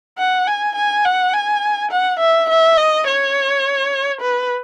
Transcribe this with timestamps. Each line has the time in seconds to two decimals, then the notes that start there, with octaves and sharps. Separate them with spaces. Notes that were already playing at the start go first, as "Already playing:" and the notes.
0.18 F#5
0.47 G#5
0.76 G#5
1.05 F#5
1.33 G#5
1.91 F#5
2.20 E5
2.50 E5
2.77 D#5
3.07 C#5
4.21 B4